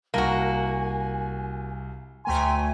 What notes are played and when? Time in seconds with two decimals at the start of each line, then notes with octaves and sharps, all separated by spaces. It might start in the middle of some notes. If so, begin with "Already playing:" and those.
0.14 C2 A#3 F#4 G#5 A5
2.25 D2 A3 G5 G#5 A#5 C6